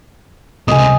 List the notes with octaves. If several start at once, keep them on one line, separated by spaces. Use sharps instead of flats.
C#2 C3 D#5 G#5